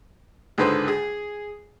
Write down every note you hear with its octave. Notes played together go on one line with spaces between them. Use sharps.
C#2 G#2 D3 B4 C5
G#4